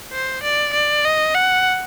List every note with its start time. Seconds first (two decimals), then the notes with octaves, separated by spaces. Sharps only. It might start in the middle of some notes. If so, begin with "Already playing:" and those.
0.13 C5
0.43 D5
0.73 D5
1.05 D#5
1.34 F#5